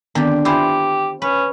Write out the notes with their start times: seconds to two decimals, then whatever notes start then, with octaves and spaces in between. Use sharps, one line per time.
0.15 D3 D#3 B3 C4 G4
0.45 E4 F4 G4 C5 G#5 B5
1.22 C#4 B4